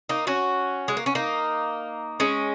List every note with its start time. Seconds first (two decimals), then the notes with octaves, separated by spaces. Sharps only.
0.09 A#3 D#4
0.27 C#4 F#4
0.88 G#3
0.97 A#3
1.06 C#4
1.15 A#3 D#4
2.20 G#3 C#4